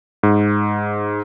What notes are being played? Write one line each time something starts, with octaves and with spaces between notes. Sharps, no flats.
G#2